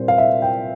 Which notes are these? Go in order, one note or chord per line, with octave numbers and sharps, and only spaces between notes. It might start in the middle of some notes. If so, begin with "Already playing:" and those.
Already playing: A#2 G3 C4 E4 C5
F5
E5
G5